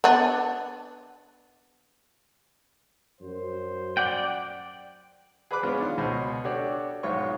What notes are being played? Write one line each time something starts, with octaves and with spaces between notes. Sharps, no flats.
B3 D4
F#2 C5
D5 F#5 G5
G#4 B4 D5 B5 D6 F#6
G#3 B3 C#4 D4 F4
D#3 F4 F5
C#2 B2 C#4 C5
D4 F#4 G4 A4 C#5 D5
B1 G#2 F4 C#5 C#6